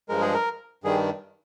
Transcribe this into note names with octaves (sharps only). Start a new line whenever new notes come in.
G2 F3 G#3 A#4
G#4
A#4
G2 D#3 G3 G#4